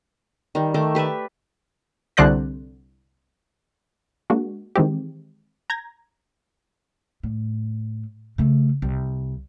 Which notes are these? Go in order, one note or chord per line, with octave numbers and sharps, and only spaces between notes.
D#3 G3
D#3 A3 D6
G4 B4 D5 E5
C2 D3 C5 D5 F#6 A#6
G#3 A#3 D4 F#4
D#3 E3 G#3 C4 G4
A#5 G6 G#6 A#6
A2
C#3 A3
C2